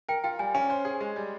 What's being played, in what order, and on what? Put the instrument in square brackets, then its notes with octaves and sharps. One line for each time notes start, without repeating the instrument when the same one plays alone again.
[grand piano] A#4 [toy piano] G5
[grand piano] F4 [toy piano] G5
[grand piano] G3 [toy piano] G#5
[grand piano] C#4 [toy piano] G#5
[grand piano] C5
G#4
G#3
G3